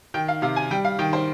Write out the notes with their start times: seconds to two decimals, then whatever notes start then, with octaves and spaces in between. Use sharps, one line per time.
0.14 D#3 G5
0.28 F5
0.42 C3 F5
0.56 G#5
0.71 G3 G5
0.85 F5
0.99 D#3 G5
1.13 C5